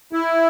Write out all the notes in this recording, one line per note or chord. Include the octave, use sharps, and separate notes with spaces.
E4